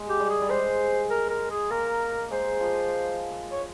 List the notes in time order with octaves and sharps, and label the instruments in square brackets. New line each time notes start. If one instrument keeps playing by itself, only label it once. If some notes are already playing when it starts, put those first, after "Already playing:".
Already playing: [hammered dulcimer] G#3
[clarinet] G4
[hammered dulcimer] G3
[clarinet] G#4
[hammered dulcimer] G3
[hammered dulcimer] G#3 [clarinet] C5
[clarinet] A#4
A#4
G#4
[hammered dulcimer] A#3 [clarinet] A#4
[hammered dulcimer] G#3 [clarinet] C5
[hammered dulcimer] F3
[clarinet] C#5